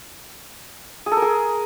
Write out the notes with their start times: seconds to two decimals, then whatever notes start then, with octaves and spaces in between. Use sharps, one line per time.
1.06 G#4
1.12 A4
1.17 A#4
1.22 G#4